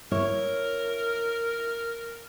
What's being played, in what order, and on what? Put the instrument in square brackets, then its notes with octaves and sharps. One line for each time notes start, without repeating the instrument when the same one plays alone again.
[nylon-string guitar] E4 C#5 [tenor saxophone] A#4